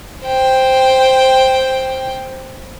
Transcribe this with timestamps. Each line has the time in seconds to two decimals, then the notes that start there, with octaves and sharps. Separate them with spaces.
0.24 C5 G5